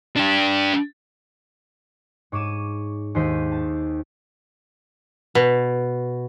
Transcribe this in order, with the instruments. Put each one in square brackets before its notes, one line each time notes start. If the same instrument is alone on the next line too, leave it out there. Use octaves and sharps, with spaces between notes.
[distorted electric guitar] D4 G4
[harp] G#2 C#5 D6 D#7 E7
D#2 D#3 G#3 C5 B6 D#7
A5
[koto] B2